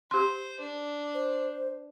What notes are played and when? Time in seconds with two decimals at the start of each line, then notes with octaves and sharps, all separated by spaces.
0.11 G4 C5 C6
0.60 D4
1.14 C5